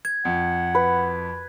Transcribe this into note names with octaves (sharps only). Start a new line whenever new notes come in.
G#6
F2 F#5
B4